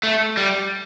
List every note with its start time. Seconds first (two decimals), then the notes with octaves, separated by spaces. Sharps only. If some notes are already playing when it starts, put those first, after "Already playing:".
0.03 A3
0.37 G3